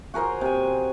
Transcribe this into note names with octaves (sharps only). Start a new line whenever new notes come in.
F#4 G#4 A#4 C5
C3 G#5